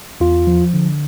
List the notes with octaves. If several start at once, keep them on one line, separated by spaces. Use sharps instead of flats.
E2 F4
F3
D3